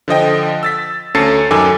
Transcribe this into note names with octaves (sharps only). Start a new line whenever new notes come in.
D3 F3 D#5 G5
E6 A6 B6
D2 C#4 A4 A6 C7 C#7
F#2 D#3 A4 G#5 D6 E6